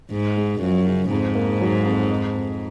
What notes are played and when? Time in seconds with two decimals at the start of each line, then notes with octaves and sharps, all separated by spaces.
0.12 G#2 G#3
0.37 G#3
0.62 F#2 F3
0.87 C#3
1.11 F2 G#2
1.35 A#3
1.61 F#3
1.85 F2
2.10 D#4
2.35 F2